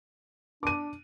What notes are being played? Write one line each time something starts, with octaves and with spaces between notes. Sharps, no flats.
D4 D6 D#7